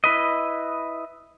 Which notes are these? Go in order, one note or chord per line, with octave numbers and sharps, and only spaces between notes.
E4 B4 D#5